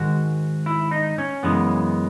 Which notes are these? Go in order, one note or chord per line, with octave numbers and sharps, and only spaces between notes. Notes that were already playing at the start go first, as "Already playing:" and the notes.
Already playing: G#2 D#3 G#3 F#4
E4
D#4
C#4
F#2 C#3 E3 G#3 B3